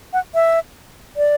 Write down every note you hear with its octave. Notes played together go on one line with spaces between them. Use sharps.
F#5
E5
D5